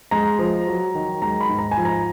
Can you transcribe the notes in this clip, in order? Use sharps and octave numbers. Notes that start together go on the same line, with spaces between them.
G#3 A#5
F3
F#3
D#3
G#3 A#5
B5
G#2
A#5
G#5
F3
A#5